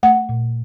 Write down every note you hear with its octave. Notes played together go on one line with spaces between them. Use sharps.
A3 F#5
A#2